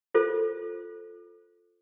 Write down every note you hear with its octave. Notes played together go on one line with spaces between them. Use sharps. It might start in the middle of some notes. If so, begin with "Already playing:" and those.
F4 A4 C5